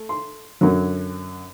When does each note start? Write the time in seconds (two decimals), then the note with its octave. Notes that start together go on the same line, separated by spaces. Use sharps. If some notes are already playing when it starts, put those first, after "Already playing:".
Already playing: A3
0.09 C6
0.61 F#2 D3 F#3